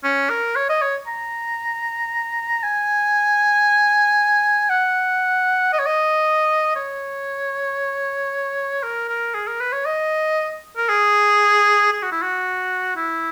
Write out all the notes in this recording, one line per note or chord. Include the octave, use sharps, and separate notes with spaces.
C#4
A#4
C#5
D#5
C#5
A#5
G#5
F#5
D#5
C#5
D#5
C#5
A#4
A#4
G#4
A#4
B4
C#5
D#5
A#4
G#4
G#4
F#4
E4
F#4
E4